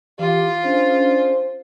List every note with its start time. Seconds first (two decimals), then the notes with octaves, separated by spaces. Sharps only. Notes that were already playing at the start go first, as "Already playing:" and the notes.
0.19 E3 F4 G4 D6
0.64 C#4 D4 G#4 C5